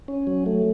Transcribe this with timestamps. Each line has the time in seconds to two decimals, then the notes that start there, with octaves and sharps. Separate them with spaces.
0.08 C#4
0.27 F#3
0.46 A3